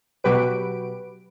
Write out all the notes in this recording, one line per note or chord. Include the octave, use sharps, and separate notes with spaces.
B2 F#3 F#4 G4 B4 D7